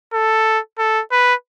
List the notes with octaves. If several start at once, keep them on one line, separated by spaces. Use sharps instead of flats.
A4
A4
B4